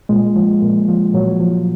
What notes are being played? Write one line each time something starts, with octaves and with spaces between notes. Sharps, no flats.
A#2 G#3
F3
A#2
F3
A#2 F#3
F3